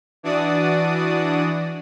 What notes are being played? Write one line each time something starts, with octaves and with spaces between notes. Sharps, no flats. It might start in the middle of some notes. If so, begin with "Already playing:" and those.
E3 D4 F#4 D5 D#6